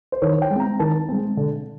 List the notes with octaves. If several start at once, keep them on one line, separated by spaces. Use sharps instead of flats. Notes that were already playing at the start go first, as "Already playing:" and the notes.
C5
D#3 C#5
G5
G#3
C4 A#5
D#3 A5
G#3 C4
D3